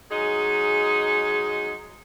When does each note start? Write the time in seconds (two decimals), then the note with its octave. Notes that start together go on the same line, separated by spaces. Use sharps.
0.11 F#3 G#3 D#4 G#4